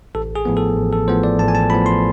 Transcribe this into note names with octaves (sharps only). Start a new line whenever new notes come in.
A1 A4
G#4
A2 F3 B3
A4
A1
A4
A2 F3 B3 C5
D5
A1 A5
G#5
A5
A2 F3 B3 B5
C6